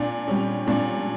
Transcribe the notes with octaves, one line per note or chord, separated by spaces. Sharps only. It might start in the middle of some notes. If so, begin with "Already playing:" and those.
Already playing: A#2 D4
G3 C#4
A#2 D4